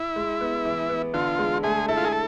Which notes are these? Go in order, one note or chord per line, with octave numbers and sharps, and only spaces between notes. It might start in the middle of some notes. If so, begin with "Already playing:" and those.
Already playing: E4
G#3
B3
E3
B3
D3 F4
G#3
A3 G#4
E4 A4
F4
G#4
A4